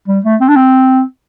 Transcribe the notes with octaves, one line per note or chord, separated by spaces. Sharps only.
G3
A3
C4
D4
C4